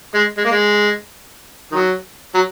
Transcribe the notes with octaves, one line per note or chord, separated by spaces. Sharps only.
G#3
G#3
A#3
G#3
D#3 F#3
F#3